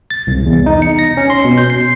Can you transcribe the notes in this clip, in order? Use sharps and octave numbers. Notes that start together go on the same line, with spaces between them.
A6
C2
E2
D#4
C#7
A#6
C#4
C6
B2
G6
C7